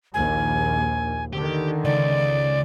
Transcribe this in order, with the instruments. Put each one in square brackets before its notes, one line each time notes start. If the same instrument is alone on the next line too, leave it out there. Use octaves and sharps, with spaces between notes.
[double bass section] A#1 D#2 [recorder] G#5
[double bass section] D3 D#3 [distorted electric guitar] G4
[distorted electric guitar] C#2 [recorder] D5